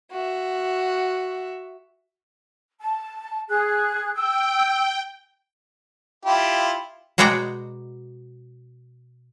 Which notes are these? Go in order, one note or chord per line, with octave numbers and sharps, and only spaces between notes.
F#4 E5
A5
G#4 F#6
G5 E6
E4 F4 G4
B2 G#3 F#4 D5 G5 A#5